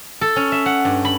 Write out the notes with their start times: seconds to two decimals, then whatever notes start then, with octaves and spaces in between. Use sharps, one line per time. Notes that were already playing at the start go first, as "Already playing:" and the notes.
0.21 A4
0.36 C#4
0.52 E5
0.66 F#5
0.85 G2
1.05 B5